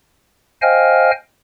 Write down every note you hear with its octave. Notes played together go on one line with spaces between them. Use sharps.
C5 D#5 F5 G5 G#5 F6